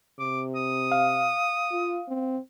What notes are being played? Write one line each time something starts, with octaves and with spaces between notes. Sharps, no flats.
C3 D6
D#6
F5
F4
C4